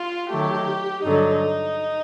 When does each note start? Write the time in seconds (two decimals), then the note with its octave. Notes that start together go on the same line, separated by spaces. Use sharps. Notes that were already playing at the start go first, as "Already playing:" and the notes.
Already playing: F4
0.30 D#3 F#3 A3 G4
1.04 G2 D3 F#3 D#4